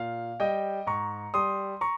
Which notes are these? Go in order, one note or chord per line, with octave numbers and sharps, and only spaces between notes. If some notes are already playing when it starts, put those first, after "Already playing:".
Already playing: A#2 F5
G3 D#5 G5
G#2 A#5 C#6
G3 C6 D#6
A#5 C#6